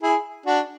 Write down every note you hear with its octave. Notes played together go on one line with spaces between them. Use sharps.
E4 G#4
D4 F#4